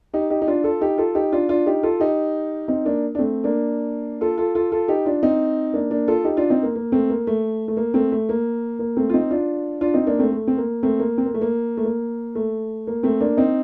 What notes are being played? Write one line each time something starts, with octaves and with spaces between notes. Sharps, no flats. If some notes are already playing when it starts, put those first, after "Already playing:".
D#4 G4
D#4 G4
D#4
D4 F4
F4 A4
D#4 G4
F4 A4
D#4 G4
D4 F4
D4 F4
D#4 G4
F4 A4
D#4 G4
C4 D#4
A#3 D4
D4
A3 C4
A#3 D4
F4 A4
F4 A4
F4 A4
F4 A4
D#4 G4
D4 F4
C4 D#4
A#3 D4
A#3 D4
F4 A4
D#4 G4
D4 F4
C4 D#4
A#3
A#3
A3 C4
A#3
A3
A3
A#3
A3 C4
A3
A#3
A#3
A3 C4
F4
C4 D#4
D4 F4
D4 F4
C4 D#4
A#3 D4
A3 C4
A3
C4
A#3
A3 C4
A#3
C4
A#3
A3
A#3
A3
A#3
A3
A#3
A3 C4
A#3 D4
C4 D#4